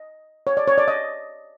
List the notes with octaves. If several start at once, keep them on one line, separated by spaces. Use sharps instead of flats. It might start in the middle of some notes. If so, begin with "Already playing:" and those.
Already playing: D#5
C#5
D5
C#5
D5
D#5